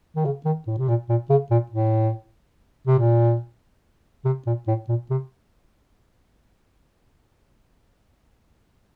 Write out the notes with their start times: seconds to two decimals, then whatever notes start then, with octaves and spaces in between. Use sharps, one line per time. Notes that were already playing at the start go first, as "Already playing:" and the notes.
0.16 D#3
0.25 C#3
0.45 D#3
0.67 A2
0.78 C3
0.88 A#2
1.09 A#2
1.30 C#3
1.51 A#2
1.71 A2
2.87 C3
2.99 A#2
4.25 C3
4.46 A#2
4.67 A2
4.89 A#2
5.10 C3